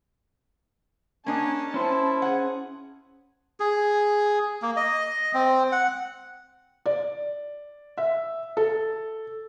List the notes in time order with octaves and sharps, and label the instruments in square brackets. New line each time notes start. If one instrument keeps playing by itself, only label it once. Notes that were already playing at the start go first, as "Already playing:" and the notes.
[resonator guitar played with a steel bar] A#3 D4 D#5 [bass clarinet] C#4 [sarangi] A5
[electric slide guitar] C#4 C5 [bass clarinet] E4
[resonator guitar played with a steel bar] G#4 F#5
[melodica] G#4
A#3
D#5
C4
F#5
[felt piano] D5
E5
A4